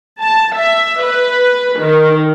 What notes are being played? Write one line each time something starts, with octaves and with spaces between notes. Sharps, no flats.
A5
E5
B4
D#3